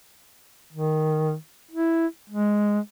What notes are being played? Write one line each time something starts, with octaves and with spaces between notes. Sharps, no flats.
D#3
E4
G#3